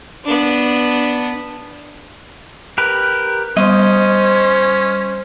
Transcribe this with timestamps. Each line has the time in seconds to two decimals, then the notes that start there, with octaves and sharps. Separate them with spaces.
0.24 B3 D4
2.78 G4 A#4 B4
3.57 G3 C#4 C5 D#5